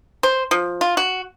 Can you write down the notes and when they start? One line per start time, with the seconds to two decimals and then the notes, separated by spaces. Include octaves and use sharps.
0.23 C5
0.51 F3
0.81 F4
0.97 F#4